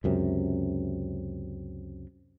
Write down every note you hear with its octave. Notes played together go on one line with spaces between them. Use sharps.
C#2 F#2 C3